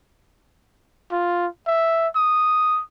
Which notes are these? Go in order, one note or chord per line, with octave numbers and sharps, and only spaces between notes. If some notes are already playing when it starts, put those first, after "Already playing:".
F4
E5
D#6